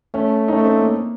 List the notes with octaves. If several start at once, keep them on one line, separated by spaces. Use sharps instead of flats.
A3 C#4
D#4
A3 C#4
C4
A#3